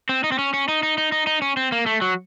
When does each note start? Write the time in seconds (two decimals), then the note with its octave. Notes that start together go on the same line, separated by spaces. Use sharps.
0.09 C4
0.24 D#4
0.32 C4
0.39 C#4
0.54 C#4
0.68 D#4
0.83 D#4
0.98 D#4
1.12 D#4
1.27 D#4
1.42 C#4
1.57 C4
1.72 A#3
1.86 A3
2.02 F#3